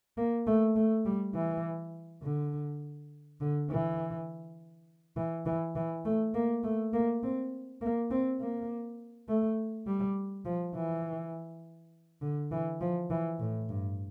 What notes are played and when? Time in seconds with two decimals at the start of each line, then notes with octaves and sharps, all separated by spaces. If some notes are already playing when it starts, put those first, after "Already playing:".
0.17 A#3
0.47 A3
0.76 A3
1.05 G3
1.35 E3
2.23 D3
3.40 D3
3.70 E3
5.17 E3
5.46 E3
5.76 E3
6.05 A3
6.34 A#3
6.64 A3
6.93 A#3
7.23 C4
7.81 A#3
8.11 C4
8.40 A#3
9.28 A3
9.87 G3
10.46 F3
10.75 E3
12.22 D3
12.52 E3
12.81 F3
13.10 E3
13.40 A2
13.69 G2